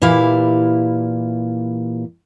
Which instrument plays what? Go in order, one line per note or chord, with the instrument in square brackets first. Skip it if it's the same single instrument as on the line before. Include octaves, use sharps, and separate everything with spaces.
[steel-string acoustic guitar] A#2 E3 E4 G4 F5